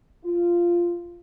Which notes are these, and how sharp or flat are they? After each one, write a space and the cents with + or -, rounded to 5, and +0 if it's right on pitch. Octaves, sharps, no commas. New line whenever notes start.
F4 -10